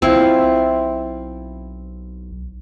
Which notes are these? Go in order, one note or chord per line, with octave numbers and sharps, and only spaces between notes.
B1 C4 E4 F4